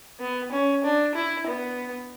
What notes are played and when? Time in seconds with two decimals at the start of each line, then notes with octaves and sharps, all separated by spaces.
0.20 B3
0.52 C#4
0.84 D4
1.15 E4
1.47 B3